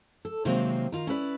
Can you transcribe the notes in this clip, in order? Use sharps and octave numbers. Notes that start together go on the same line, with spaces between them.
A4
C3 D#3 F#3 G#3 A#3 C4
D#3 F4 A#4
C#4 E4 B4 D5